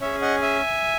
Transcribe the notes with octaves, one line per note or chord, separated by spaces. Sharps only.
C#4 G#4 C#5 E5
D#5 F#5
E5 G#5